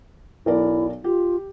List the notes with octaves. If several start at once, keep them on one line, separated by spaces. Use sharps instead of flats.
B1 E4 A#4 D5
F4 G4